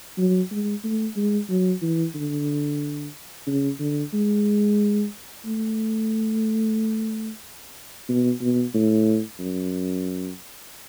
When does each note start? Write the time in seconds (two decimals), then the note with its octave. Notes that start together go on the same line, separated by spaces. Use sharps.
0.18 F#3
0.51 G#3
0.84 A3
1.16 G#3
1.50 F#3
1.82 E3
2.15 D3
3.47 C#3
3.80 D3
4.14 G#3
5.46 A3
8.09 B2
8.41 B2
8.74 A2
9.40 F#2